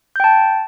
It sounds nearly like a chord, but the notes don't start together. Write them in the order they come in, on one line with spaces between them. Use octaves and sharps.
G6 G5 A5